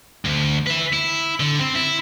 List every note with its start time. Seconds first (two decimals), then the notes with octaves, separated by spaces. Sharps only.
0.25 D2
0.67 B4 E5
0.93 E4
1.40 D3
1.60 C4
1.75 E4